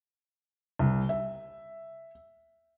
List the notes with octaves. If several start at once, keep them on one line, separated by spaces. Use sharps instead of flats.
C2
E5